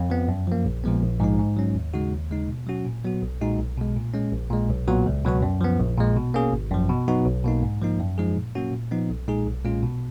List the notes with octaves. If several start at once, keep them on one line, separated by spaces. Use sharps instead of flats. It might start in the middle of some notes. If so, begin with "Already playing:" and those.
Already playing: F2
F3 B3
F#2
F3 A#3
A#1
A#2 F3 G#3 B3
A#1
G#2 F3 G#3 D#4
G#2
F#3 C#4
D#2
C#3 G#3 D#4 F#4
D#2
C#3 G#3 D#4
B2
F#3 C#4 F#4
A#2
F#3 B3 F#4
B1
A#2 G#3 D#4 F#4
B1
B2 G#3
A#2
G#3 C#4
A#1
A#2 G#3
B1
A#2 F#3 B3 F#4
C#2
B2 F#3 B3 F#4
F#2
F3 B3
A#1
A#2 G#3
B2
A#3 C#4 G#4
G#1
F#2 F3
B2
F#3 B3 D#4 F#4
B1
B2 A#3 D#4
G#2
F3 A#3 D#4
F#2
F3 G#3 D#4 G#4
A#2
F#3 A#3 C#4 F#4
A#2
F3 B3 D#4
B1
A#2 G#3 D#4 G#4
B1
A#2 G#3 C#4 F4
B2